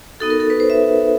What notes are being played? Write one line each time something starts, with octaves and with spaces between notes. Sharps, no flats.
B3 D#4 F#4 A4
A#4
A4
B4
C5
E5